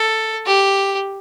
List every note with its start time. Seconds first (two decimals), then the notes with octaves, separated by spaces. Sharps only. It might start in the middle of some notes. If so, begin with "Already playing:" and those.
Already playing: A4
0.46 G4